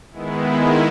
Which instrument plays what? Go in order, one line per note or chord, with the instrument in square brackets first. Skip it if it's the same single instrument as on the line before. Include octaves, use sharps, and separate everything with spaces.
[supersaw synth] D#3 G#3 B3 E4